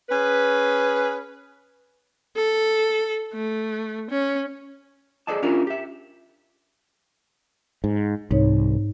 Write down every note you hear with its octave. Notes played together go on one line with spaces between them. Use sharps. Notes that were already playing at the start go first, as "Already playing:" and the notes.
C#4 G#4 B4
A4
A3
C#4
G#4 A4 C5 D5 D#5 A5
C#4 D4 E4 F4 G4 A#4
G4 E5
G#2
C2 G#2 D#4 C#5